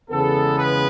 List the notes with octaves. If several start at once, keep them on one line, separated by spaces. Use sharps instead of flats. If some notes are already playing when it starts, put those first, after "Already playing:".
E2 C#3 G#3 B3 A4
B4